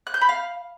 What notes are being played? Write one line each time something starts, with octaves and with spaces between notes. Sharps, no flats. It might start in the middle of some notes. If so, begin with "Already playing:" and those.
F#6
G6
B5
F5